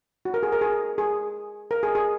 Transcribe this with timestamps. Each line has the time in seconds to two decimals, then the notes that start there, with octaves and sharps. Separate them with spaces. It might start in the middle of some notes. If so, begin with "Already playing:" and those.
0.25 F#4
0.34 A#4
0.43 G#4
0.52 A#4
0.61 G#4
0.98 G#4
1.71 A#4
1.83 G#4
1.95 G#4